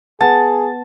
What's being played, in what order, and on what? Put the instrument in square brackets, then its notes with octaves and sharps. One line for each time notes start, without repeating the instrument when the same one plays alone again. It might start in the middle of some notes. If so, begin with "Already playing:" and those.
[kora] B3 [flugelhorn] G#4 [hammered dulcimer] A5